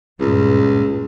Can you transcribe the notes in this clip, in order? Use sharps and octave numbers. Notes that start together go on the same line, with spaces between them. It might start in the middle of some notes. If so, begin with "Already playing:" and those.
C#2 G2 A#2